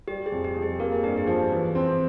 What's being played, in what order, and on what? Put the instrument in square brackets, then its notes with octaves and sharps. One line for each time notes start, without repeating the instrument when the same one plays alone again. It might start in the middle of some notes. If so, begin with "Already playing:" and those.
[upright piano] G3 [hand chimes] G4
[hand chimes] G#4
[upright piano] F2
[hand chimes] G4
[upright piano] F2
[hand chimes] G#4
[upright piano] A#3 [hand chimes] A#4
[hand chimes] G#4
[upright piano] G2 [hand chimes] G4
[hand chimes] G#4
[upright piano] F3
E3
C4